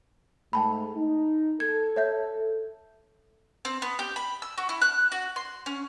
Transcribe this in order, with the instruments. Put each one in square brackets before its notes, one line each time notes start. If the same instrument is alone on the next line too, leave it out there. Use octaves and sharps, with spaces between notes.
[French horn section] G#2 G#3 A3 [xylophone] G5 A5 B5
[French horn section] D#4
[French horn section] A4 [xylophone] G#6
[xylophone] C#5 E5 G6
[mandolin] C4
B3
G4
B5
E6
F#4
E4
F#6
F#4
C6
C#4